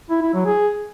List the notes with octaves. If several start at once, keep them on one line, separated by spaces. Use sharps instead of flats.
E4
E4
F#3
G#4